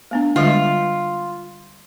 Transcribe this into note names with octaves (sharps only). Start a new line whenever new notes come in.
A3 B3 D4
D3 G3 G#3 F4